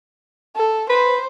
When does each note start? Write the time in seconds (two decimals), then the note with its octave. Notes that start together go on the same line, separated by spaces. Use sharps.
0.56 A4
0.90 B4 C5